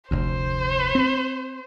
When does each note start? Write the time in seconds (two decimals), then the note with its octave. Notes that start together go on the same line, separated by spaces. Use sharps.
0.11 F1 D2 C5
0.95 C4